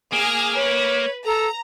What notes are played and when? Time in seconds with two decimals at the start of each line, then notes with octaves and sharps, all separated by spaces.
0.13 A#3 G#4 G#5 F6
0.55 B4 C#5
1.25 A4 A#5